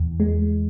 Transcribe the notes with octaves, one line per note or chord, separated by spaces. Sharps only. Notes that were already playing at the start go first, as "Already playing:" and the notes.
Already playing: E2 E3
G#3